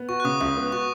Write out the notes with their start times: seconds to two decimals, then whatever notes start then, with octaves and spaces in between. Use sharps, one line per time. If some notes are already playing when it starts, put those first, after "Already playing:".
Already playing: B3
0.09 F#4 C#6
0.20 F#6
0.25 C#3 D#6
0.41 C#2 D#6
0.57 B3
0.72 F#4 C#6